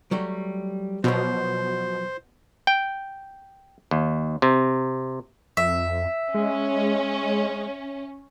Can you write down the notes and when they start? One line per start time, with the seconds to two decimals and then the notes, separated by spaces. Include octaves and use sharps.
0.11 F#3 G3 A3
1.04 B2 F3 F#3 C5
2.67 G5
3.91 D#2
4.42 C3
5.57 F2 E5
6.34 G#3 C#4